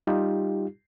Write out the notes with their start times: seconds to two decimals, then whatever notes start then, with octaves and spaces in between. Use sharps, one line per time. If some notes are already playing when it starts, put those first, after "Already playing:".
0.07 G3 D#4 F4 G4